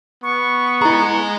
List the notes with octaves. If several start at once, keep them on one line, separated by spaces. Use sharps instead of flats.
B3 C#6
E4 G#4 D#5 A#5